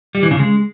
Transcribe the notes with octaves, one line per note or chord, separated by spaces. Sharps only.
G3
E3
C#3
G#3